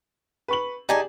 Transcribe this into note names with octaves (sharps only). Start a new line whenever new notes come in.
B4 C#6 F#7
D#4 G4 G#4 D5 G#5 A5